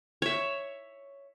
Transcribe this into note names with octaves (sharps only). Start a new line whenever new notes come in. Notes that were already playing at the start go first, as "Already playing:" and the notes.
C#5 E5